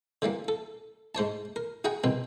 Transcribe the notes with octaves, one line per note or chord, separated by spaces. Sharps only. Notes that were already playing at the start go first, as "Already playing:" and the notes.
D3 E3 G3 A#3
A4
G#2 C5 C#5 A5
A#4
F#4 G#4 F#5 G5 A#5
C2 B2 D#3 C4